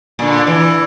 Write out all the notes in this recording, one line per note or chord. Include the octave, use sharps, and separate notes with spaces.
A#2 D3
E3